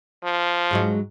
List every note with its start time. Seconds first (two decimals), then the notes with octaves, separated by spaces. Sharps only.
0.24 F3
0.71 G#2 F#3 G#3